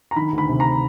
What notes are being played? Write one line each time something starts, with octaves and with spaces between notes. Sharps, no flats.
A#5
D#3 B5
D2
B5
C3
A#5